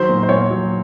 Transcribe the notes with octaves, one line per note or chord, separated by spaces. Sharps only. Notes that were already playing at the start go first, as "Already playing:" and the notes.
Already playing: D#3 F#3 C5
A#2
C5
A#2 C#5
F#3